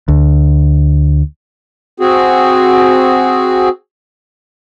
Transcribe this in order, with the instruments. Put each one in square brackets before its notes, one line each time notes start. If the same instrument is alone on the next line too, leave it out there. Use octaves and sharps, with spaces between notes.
[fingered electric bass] D2
[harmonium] C4 F#4 G#4